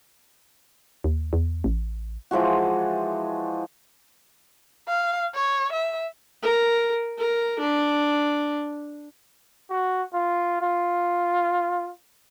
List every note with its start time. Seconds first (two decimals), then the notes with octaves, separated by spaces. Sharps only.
1.04 D#2
1.33 E2
1.64 A1
2.31 E3 F3 G#3 F#4
4.88 F5
5.34 C#5
5.72 E5
6.42 A#4
7.18 A#4
7.59 D4
9.70 F#4
10.14 F4
10.61 F4